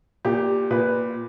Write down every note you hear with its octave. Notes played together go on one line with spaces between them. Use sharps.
A#2 G4
A#2 B4